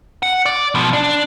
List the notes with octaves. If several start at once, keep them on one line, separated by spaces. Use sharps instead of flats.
F#5
D5
B2 F3
D4